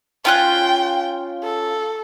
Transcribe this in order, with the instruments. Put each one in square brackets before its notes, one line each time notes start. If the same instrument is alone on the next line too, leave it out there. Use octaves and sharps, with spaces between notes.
[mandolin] C#4 F4 F#6 [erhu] G5
[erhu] A4